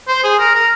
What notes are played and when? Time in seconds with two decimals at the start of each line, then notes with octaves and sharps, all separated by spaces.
0.08 C5
0.24 G#4
0.39 A#4
0.55 A#4